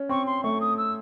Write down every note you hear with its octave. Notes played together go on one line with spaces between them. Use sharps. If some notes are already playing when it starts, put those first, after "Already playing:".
Already playing: C#4
C4 C#6
C6
A3 C#6
D#6
E6